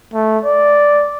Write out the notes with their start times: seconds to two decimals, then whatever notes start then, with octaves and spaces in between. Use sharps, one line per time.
0.14 A3
0.45 D5